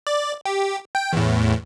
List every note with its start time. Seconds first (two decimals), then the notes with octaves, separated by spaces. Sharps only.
0.07 D5
0.46 G4
0.95 G5
1.13 E2 A2